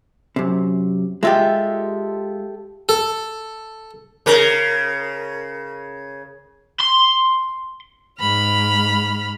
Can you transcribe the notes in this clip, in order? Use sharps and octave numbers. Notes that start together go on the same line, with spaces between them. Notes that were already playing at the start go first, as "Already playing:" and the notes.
F#2 C3
G#3 F4 G4 A4 E5
A4
C#3 A#4
C6
G#2 B5 F6